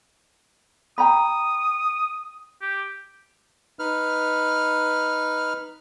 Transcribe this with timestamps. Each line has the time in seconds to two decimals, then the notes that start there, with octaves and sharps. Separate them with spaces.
0.98 G5 A#5 B5 D#6
2.62 G4
3.79 D#4 B4 F6